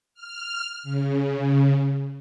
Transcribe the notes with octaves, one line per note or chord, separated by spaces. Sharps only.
F6
C#3